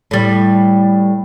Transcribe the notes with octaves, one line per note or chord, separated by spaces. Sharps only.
A2 G3